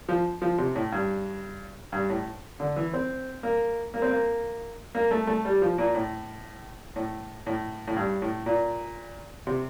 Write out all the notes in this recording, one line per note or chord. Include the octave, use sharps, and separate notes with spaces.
F3
F3
C3
A2
G2
G2
A2
D3
E3
C4
A#3
A#3
C4
A#3
A#3
A3
A3
G3
F3
A#2
A2
A2
A2
A2
G2
A2
A#2
C3